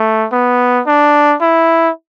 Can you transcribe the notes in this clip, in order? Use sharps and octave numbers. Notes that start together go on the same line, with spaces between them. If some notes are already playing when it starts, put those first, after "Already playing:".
Already playing: A3
B3
D4
E4